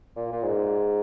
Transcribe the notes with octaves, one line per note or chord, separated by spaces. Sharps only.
A#2
A#2
G#2